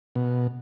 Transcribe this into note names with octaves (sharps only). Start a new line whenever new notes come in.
B2